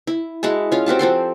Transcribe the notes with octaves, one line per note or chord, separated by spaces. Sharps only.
E4
G#3 E4 F#4 A5
C#4 F4
C4 F#4 G4 A5
F3 C4 A4 C6